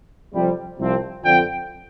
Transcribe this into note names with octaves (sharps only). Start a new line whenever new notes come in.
F2 C3 G3
C2 C3 F3 C4
F2 D3 F3 G5